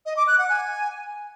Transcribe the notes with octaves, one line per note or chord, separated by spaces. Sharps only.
D#5
D6
F#6
F#5
G#5